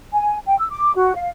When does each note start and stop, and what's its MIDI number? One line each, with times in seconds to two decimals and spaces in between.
0.12 0.38 80
0.46 0.56 79
0.58 0.69 88
0.70 0.93 86
0.96 1.12 66
1.14 1.30 77